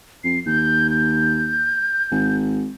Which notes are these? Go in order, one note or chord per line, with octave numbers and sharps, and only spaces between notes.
F2 C7
D#2 G6
G6
G#1